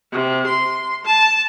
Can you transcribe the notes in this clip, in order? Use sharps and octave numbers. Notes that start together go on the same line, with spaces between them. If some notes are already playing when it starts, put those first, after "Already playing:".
C3
C6
A5